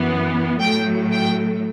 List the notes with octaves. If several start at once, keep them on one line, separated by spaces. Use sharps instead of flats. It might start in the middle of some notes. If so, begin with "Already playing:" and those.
Already playing: F#2 E3 B3
A2 F#3 A3 G5
G5